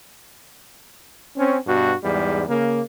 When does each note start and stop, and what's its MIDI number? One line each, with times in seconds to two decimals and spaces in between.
1.36 1.58 60
1.36 1.58 61
1.66 1.93 43
1.66 1.93 47
1.66 1.93 66
2.02 2.43 40
2.02 2.43 44
2.02 2.43 55
2.48 2.80 49
2.48 2.80 58